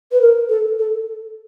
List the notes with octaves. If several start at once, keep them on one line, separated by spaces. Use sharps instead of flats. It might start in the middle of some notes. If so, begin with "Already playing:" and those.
B4
A#4
A4
A4